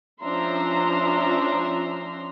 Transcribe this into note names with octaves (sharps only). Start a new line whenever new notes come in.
F3 C#4 D4 E5 A#5 C6